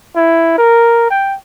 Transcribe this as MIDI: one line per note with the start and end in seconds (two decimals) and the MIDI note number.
0.16 0.54 64
0.58 1.09 70
1.11 1.35 79